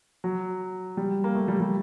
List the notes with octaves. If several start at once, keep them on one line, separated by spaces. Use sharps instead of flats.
F#3
G3
A#3
A3
G3
G3